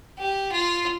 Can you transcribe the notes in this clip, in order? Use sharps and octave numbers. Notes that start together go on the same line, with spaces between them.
G4
F4